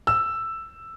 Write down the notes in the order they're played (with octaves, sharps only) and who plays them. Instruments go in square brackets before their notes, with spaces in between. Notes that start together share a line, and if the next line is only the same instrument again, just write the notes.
[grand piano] E6